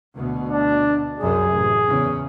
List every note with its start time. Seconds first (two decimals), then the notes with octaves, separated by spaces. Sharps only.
0.14 D2 B2
0.49 D4
1.20 C2 F#2 C3 G#4
1.52 A1
1.88 E2 C#3